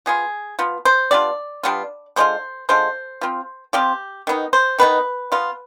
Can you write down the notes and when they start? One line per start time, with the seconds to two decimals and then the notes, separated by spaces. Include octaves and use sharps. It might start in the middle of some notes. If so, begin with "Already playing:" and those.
0.06 F3 B3 F4 G#4
0.59 F3 B3 F4
0.85 C5
1.11 G3 B3 D4 F4 D5
1.63 G3 B3 D4 F4
2.16 D3 G#3 D4 F4 C5
2.69 D3 G#3 D4 F4 C5
3.21 F3 C4 F4
3.73 F3 C4 F4 G4
4.27 D#3 B3 D#4
4.53 C5
4.78 D#3 B3 D#4 B4
5.32 F3 B3 F4